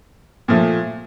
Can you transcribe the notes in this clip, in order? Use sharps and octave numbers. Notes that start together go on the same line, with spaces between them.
A#2 F3 A3